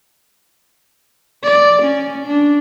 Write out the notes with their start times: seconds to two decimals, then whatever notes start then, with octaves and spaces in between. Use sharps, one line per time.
1.44 D5
1.83 C#4
2.27 D4